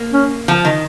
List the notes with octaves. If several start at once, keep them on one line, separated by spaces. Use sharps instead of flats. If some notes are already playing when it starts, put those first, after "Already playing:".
Already playing: A#3
C#4
F3
D#3